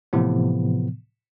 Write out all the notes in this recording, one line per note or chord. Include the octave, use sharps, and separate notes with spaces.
A2 C3 E3 F3 B3